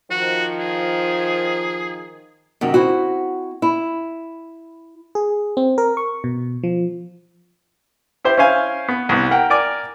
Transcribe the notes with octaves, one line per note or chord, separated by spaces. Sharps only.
D#3 F3 F#4
G#4
F#2 C3 D#3
C4 E4 F#4
E4
G#4
C4
A#4
C#6
B2
F3
E4 G4 C5
C#4 E4 C5 F5 G#5
B3
C2 B3
A#4 F#5 G5
A#4 D5 G#5 D6